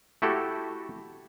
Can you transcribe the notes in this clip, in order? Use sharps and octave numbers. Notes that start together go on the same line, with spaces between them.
A3 E4 F#4 G4 A4